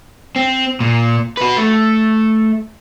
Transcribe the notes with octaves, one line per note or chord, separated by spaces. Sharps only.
C4
A#2
F#4 B4
A3